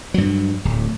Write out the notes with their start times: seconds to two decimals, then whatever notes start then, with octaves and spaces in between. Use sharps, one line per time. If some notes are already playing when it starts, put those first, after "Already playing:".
0.14 G2 F#3
0.65 D1